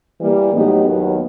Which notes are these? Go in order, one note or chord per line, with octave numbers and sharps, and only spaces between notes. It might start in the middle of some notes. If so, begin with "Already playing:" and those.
E3 G3 A#3
A2 F#3 B3 D#4 G4
D#2 D#3 F#3 B3